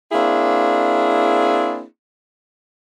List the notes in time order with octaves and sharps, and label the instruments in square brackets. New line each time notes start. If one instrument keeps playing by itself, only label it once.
[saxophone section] A#3 C4 D4 E4 G#4